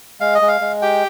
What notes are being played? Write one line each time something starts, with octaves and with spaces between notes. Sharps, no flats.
G#3 F5
D#5
G#3
F5
G#3
G4 G5